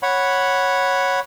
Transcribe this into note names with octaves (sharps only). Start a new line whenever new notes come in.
C#5 F#5 B5